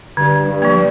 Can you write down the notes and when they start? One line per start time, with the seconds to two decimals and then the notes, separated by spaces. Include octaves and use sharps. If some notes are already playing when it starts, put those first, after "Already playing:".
0.17 G2 D3
0.47 G2
0.62 F3 A#3